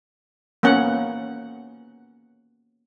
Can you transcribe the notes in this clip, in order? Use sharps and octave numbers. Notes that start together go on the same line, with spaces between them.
A#3 B3 C#4 F#5